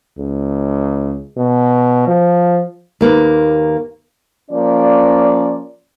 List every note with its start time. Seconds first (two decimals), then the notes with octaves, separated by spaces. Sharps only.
0.19 C#2
1.37 B2
2.07 F3
3.01 D#2 A#3 B4
4.51 F3 A#3 C#4 D5